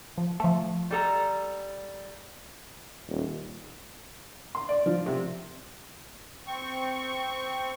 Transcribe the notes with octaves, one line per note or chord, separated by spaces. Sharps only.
F3
F3 A3
G3 A4 A#5
D#1
C6
D5
F3
C3
C4 C#6